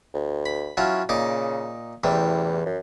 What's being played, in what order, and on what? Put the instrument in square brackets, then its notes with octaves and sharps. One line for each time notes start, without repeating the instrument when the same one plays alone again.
[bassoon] D2
[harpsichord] B5
[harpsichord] F#3 C#4 F4 [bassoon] E4
[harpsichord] A#2 D#4 D6 [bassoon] C#3
[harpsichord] A1 C3 G3 [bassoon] E2
[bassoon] F#2